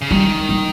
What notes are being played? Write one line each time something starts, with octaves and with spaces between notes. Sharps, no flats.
C#3
D#3 G3
G3